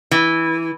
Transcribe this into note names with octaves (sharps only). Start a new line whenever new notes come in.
E3